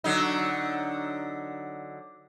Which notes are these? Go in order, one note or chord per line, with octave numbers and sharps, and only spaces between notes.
D3 F#3 D#4